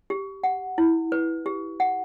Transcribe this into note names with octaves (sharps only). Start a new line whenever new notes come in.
G4
F#5
E4
B4
G4
F#5